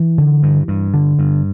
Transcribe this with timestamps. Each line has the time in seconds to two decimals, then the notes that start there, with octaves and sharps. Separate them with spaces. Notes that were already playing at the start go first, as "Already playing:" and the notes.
Already playing: E3
0.18 D3
0.43 G2
0.68 G2
0.94 D3
1.19 G2